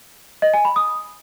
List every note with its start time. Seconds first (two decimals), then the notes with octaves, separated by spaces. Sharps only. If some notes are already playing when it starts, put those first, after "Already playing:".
0.42 D#5
0.53 G#5
0.65 B5
0.76 D#6